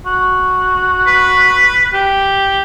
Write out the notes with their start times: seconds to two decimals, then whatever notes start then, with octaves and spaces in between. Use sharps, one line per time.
0.06 F#4
1.07 B4
1.94 G4